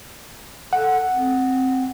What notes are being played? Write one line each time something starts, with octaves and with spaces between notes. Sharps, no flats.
A4 F#5
C4